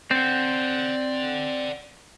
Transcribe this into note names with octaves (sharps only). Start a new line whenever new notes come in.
C4 D5 F#5